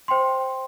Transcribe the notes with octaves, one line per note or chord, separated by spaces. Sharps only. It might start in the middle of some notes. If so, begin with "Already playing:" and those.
C5 G5 C6